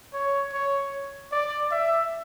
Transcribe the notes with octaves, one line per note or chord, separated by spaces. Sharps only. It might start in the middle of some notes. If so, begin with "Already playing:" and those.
C#5
C#5
D5
E5